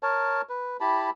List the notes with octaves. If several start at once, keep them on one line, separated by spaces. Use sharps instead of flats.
A#4 C#5 A5
B4
E4 G4 A5 B5